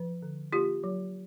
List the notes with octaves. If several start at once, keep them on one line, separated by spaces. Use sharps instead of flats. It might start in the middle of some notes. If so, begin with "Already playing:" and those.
Already playing: F3
D3
A#3 F4 G4
F#3